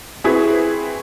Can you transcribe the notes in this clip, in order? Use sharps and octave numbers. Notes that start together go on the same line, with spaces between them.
C4 E4 F#4 G#4 B4